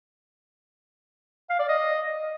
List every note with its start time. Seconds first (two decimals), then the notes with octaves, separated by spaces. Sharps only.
1.50 F5
1.59 D5
1.68 D#5